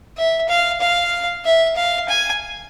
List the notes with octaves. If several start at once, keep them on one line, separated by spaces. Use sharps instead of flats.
E5
F5
F5
E5
F5
G#5